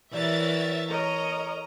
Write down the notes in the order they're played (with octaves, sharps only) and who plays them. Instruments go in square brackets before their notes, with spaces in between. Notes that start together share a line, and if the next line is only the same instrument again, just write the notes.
[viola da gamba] E3 A#4 [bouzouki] F#3 G3 B3 [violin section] C#5 E5 A6
[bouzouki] A3 [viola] A#4 D#5 [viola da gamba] C#5 [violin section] A#5